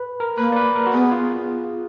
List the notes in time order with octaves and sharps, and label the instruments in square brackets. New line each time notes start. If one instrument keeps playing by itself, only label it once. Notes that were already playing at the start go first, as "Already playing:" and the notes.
Already playing: [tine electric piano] B4
A#4
[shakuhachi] A#3 [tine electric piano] B4
[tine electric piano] D5
B4
A#4
F#4
[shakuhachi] B3 [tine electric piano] G#4
[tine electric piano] F4